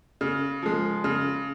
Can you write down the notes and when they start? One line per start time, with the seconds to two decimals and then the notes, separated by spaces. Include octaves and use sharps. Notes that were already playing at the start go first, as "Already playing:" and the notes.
0.21 C#3
0.62 F3 G#3
1.04 C#3